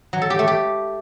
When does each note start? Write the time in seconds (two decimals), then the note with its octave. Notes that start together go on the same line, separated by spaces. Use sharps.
0.13 F#3
0.22 A4
0.30 G4
0.39 A3
0.47 G4